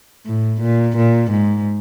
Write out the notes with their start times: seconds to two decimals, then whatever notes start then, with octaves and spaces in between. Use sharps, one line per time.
0.26 A2
0.61 A#2
0.97 A#2
1.30 G#2